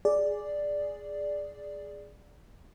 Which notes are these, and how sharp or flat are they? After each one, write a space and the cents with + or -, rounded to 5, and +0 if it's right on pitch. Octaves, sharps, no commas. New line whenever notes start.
G#4 +0 D5 +0